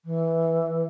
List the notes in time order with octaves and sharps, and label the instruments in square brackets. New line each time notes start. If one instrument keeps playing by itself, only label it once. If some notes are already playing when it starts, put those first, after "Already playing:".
[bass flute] E3